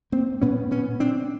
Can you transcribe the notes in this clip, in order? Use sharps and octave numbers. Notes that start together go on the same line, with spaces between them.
A#3 C4
A#2 B3 C#4
B3 C#4
C4 D4